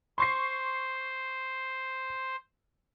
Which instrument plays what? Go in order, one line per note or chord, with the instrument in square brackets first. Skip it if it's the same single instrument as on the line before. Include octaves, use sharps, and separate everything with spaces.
[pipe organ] C5 [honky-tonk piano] C6 C#6 C7